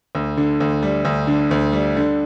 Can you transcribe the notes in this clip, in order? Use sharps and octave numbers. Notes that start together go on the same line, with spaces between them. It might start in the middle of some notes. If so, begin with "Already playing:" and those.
D2
D3
D2
G3
D2
D3
D2
G3
D3